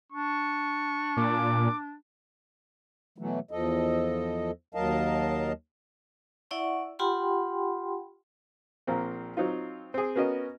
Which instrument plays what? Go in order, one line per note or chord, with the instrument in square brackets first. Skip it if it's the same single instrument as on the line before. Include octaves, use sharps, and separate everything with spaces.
[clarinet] D4 [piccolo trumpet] C#6
[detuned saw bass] A#2 [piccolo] D6
[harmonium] B2 E3 F#3 A3
E2 F3 A4 D#5
D#2 F#3 A#4 D#5 F5 A5
[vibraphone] E4 D5 E5 F#5 C#6
F4 G4 F#5 G5 B5 C6
[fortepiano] A#1 A#2 A#3 C4
F#3 C4 D#4 F4
C4 G#4
B3 C#4 F#4 A#4 D#5